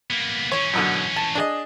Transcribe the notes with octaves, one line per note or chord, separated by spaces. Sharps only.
A#3 B3
E3 C#4 C#5
F#2 B2 D3
A5
D4 G#4 D#5